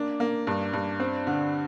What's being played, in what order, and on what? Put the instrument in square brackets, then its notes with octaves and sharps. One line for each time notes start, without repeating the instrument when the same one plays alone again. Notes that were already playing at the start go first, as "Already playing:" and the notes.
Already playing: [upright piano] A#3 D4
A#3
G2
G2
C4
D3